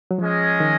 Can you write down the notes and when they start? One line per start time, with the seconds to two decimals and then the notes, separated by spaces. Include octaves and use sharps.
0.11 F#3
0.18 F3 G#3 C#4 G#4 D#5
0.60 D#3